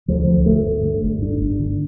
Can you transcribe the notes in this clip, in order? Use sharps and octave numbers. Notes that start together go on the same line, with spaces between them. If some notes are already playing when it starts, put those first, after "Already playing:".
D2 F3
D2
G1 A3
G2
D3
G1
G2 D4
G1
D3